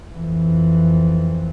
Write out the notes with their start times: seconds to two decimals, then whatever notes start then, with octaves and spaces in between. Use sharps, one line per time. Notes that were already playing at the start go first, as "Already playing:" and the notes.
0.13 F2 E3